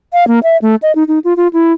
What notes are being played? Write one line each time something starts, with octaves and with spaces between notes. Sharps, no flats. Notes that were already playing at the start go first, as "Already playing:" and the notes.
F5
A#3
E5
A3
D#5
D#4
D#4
F4
F4
E4